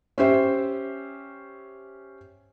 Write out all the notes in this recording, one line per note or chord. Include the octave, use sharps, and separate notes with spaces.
C#4 G4 C5 E5